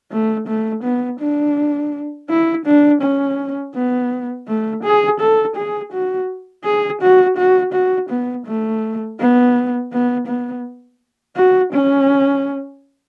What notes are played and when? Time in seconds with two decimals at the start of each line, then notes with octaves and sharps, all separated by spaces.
0.11 A3
0.47 A3
0.83 B3
1.19 D4
2.29 E4
2.66 D4
3.01 C#4
3.74 B3
4.47 A3
4.83 G#4
5.20 A4
5.56 G#4
5.92 F#4
6.65 G#4
7.01 F#4
7.37 F#4
7.73 F#4
8.09 B3
8.46 A3
9.19 B3
9.92 B3
10.27 B3
11.36 F#4
11.73 C#4